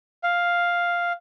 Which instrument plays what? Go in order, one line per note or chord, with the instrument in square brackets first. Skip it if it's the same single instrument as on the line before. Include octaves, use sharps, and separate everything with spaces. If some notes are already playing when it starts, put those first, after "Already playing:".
[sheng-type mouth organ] F5